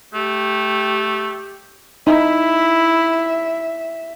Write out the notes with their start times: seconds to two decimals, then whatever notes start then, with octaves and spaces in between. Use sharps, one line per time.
0.14 A3 G4
2.07 D#4 E4 E5